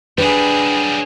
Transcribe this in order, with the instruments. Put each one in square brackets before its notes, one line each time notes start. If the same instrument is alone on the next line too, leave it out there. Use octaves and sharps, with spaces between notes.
[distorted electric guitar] F#3 G3 [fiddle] D4 G#4 [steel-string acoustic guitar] B4